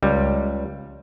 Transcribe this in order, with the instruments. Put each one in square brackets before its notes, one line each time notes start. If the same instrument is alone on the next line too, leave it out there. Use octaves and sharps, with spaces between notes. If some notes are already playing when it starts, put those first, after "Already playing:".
[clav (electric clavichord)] C#2 G3